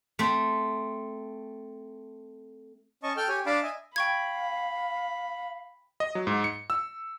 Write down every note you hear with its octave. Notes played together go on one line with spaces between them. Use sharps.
A3 C4
C#4 D#5 A5 C#6
A4 G5 F6 G6
G4 C#5 G#5
D4 F5 A5 B5 D6
D#5 E5 G#5
F5 G5 B5 C#6 G#6
D#5
F#3
G#2
C#7
E6